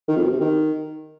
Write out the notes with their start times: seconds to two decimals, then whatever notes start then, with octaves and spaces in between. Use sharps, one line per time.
0.08 D#3
0.16 F2
0.24 B2
0.32 C3
0.40 D#3